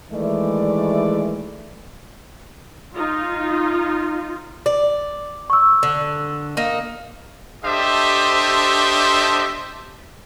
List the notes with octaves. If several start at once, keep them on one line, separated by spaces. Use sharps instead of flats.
D#3 E3 G#3 A3 D5
D#4 F4
D5
C#6 E6
D3
A#3 D#4
D4 G4 A4 C5 D#5 E5